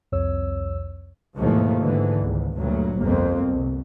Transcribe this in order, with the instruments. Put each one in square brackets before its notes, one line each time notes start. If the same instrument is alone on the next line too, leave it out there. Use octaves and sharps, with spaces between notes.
[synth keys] C2 F2 C#5 E6
[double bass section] D#2 G#2 B2 E3 F3 A3
G#2 D3 E3
G#1 C#2
D2 G2 A#2 F#3
G1 C2 F2 A#3 C4
C2